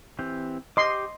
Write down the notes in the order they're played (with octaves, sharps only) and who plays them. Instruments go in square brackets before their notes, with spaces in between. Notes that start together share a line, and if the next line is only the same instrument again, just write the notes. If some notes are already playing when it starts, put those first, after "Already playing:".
[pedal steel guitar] E3 C4 G4
[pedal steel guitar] G4 D6 [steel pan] D#5 C6